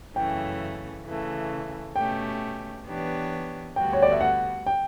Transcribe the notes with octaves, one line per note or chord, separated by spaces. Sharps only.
F#2 C#3 E3 A3 C#4 G5
C#3 E3 A3
B2 A3 C#4 G4 G5
E3 B3 D4 G4 C#5
D2 D3 G3 B3 F#4 G5
C#5
D5
E5
F#5
G5